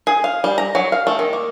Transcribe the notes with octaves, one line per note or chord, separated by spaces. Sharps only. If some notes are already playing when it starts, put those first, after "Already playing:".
G#4
F5
G3
A#5
F#3
F5
A3
D#3
A#3